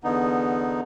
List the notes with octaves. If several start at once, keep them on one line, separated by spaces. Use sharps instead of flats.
E2 D3 B3 D#4